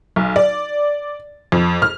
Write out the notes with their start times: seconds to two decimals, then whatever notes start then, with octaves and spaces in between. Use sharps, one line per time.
0.16 B1
0.36 D5
1.52 F2
1.82 F6